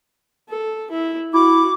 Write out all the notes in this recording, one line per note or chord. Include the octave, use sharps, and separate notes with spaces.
A4
E4
E4 F#4 D6